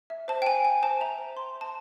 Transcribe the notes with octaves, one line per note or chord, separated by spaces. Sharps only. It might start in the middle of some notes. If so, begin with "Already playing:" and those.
E5
C5 A5
G5
C5 G#5
G5 G#5
C5 A5
E5 A#5
C5
C5 C6
C5
A5